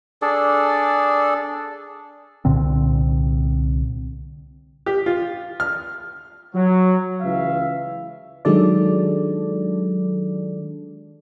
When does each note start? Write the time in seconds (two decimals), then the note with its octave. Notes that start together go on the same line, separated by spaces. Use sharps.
0.22 D4 G#4 A4 D5
2.45 C2 A#2 D3 C4
4.86 G4
5.06 F4
5.60 F6
6.54 F#3
7.21 C#2 E3 E5 F5
8.45 D#3 F#3 G#3 D4 A4 D5